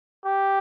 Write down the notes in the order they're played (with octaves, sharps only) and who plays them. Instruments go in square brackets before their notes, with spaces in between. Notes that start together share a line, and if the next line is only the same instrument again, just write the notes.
[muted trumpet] G4